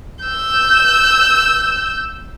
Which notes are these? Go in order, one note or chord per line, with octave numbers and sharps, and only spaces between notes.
E6 G6